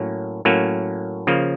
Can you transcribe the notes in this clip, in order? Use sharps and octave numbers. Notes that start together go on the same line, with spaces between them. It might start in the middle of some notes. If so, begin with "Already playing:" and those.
Already playing: A2 F#3 A#3 C#4
A2 F#3 A#3 C#4
C#3 F3 A#3